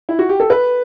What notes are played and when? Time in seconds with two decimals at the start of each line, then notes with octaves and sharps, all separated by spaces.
0.09 E4
0.19 F#4
0.29 G4
0.40 A4
0.50 B4